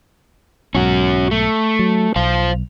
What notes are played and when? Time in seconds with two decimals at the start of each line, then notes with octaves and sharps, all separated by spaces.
0.75 B1 G#2 C#4 F#4
1.31 A3
1.79 F#3
2.16 B1 C5 F5